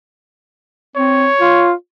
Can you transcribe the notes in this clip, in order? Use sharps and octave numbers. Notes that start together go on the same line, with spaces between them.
C4 C#5
F4